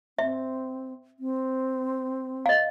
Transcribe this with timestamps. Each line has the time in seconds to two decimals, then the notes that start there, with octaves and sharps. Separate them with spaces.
0.19 C4 E5
1.19 C4
2.46 D#5 F5